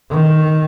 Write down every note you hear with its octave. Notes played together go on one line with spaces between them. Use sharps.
D#3